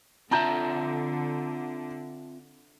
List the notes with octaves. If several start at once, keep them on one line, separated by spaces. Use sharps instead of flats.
D3 C4 F4 E5 A5 A#5 G6